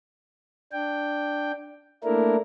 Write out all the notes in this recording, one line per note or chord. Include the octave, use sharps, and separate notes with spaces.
D4 G5
A3 A#3 D4 E4 A#4